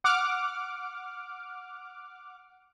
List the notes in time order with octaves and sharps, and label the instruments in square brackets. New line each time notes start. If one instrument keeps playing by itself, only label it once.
[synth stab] F#5 D6 F6